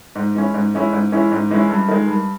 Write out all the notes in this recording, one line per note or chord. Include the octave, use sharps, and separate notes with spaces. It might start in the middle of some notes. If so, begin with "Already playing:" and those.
G#2
E3 G#3 C#4 E4
G#2
E3 G#3 C#4 E4
G#2
E3 G#3 C#4 E4
G#2
E3 G#3 C#4 E4
G2
D#3 G#3
G2